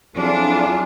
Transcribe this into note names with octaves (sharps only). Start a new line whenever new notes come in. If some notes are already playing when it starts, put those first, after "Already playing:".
F2 F#3 D4 E4 F4 G#4